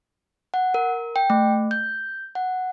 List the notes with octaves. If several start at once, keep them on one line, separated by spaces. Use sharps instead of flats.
F#5
A#4
G5
A3
G6
F#5